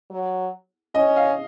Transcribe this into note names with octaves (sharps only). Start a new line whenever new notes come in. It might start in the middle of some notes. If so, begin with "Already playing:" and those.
F#3
C#4 D#5
F5